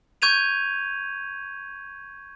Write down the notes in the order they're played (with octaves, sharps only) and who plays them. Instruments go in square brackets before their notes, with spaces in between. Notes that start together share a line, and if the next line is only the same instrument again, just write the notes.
[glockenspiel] C#6 G6 G#6 D#7 F7